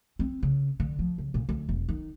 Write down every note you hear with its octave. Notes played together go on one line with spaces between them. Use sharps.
C4
C#3
D3
F3
C#3
A#2
D2
E1
D#3